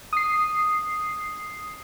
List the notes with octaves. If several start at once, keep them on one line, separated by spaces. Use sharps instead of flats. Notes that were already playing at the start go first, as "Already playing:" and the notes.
D#6 C7